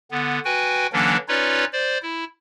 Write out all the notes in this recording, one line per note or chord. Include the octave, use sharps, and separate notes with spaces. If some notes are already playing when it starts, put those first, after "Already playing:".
D3 B3
F#4 B4 G5 G#5
D3 E3 F#3 A#3 C#4 D4
C#4 D#4 F4 B4 C#5 D5
C5 D5
E4